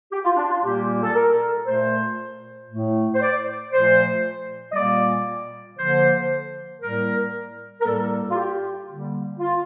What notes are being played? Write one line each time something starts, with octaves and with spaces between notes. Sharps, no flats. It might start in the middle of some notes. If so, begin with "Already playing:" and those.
G4
F4
D4
F4
A#2 G3 A#3 G4
A4
A#4
A#2 A3 C5
A2 A3
C5
D5
A#2 F3 A3 C5
D#5
A#2 G3 A#3 D5
D3 F3 A#3 C5
A2 G3 A#3 A#4
A#4
A2 G3 A#3 A4
F4
G4
D3 G3 A#3
F4